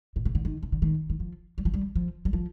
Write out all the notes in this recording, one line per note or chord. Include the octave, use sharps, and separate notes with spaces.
A#2
C3
D3
D#3
C3
D3
D#3
D#3
F3
G3
F3
G3
F3
G3
F3